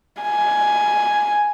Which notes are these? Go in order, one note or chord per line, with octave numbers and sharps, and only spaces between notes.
G#5